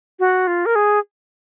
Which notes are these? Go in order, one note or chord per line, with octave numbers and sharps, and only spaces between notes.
F#4
F4
A#4
G#4